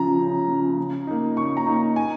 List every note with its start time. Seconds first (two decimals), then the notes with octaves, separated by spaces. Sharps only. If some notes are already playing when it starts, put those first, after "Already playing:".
Already playing: C#3 F3 C#4 A#5
0.19 C#3
0.48 F3 C#4
0.77 C#3
1.07 A#3 D#4
1.36 C#3 C#6
1.57 A#5
1.67 A#3 D#4
1.76 A#5
1.96 G#5